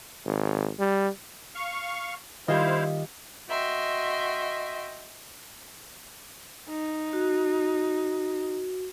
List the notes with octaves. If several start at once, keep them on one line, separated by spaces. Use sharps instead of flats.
G#1
G3
F5 C#6
D#3 G3 E4 F4 C5 D#5 F5
F#4 D#5 E5 G5 C6
D#4
F#4